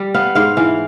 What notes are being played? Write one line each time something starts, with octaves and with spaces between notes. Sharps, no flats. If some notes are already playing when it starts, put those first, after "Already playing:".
Already playing: G3
B3 F5
G#2 F5
E3 F5